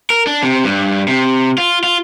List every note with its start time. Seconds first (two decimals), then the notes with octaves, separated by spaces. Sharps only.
0.10 A#4
0.27 D4
0.43 C3
0.64 G2
1.08 C3
1.58 F4
1.83 F4